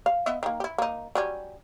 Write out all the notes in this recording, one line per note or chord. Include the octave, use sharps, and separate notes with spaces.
F5
B3 D#5 E5
D#3 A#3
E4 G4
A#3 D#4
F#3 G3 C#4